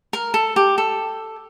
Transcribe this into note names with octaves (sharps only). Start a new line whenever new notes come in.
A#4
A4
G4
A4